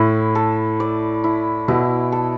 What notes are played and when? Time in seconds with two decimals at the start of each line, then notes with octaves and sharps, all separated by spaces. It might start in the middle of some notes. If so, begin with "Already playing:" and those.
Already playing: A2 E4
0.35 A4
0.80 D5
1.24 E4
1.68 B2 E4
2.12 A4